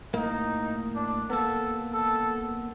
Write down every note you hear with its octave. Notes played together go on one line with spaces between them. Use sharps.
A2 A#3 D#4
D4
A#3 B3 A4
A4